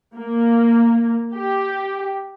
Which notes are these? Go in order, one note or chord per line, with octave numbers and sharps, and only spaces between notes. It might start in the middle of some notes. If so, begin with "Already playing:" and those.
A#3
G4